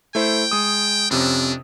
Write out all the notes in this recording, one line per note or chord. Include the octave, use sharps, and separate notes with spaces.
A3 E4 C5 G5
G#3 D#6
F2 C3 C#4 D4